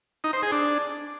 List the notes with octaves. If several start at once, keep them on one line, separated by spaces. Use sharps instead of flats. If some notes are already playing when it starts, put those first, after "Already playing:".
D#4
C5
G#4
D4